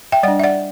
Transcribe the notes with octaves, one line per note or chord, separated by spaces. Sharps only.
E5 G5
G3 D4 D5 F#5
E5
D5 F#5